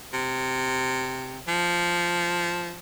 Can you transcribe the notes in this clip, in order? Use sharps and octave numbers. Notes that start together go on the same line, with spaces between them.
C3
F3